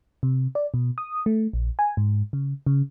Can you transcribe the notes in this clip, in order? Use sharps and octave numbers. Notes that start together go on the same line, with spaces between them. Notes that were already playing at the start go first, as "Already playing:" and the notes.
C3
D5
B2
D#6
A3
A#1
G#5
G#2
C#3
C#3